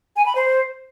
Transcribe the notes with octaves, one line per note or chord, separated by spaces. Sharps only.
G#5
B5
C5